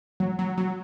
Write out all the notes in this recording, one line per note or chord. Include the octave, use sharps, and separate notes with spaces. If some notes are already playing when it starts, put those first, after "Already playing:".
F#3
F#3
F#3